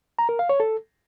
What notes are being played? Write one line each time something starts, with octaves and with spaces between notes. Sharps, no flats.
A#5
A#4
F5
C#5
A4